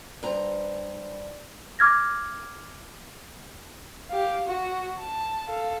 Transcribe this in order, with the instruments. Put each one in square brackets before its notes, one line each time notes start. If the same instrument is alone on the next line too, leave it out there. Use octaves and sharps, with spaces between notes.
[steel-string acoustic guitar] G2 C5 A#5
[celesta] D6 F6 G#6 A#6
[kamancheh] G4 F5
F#4
A5
A4 F5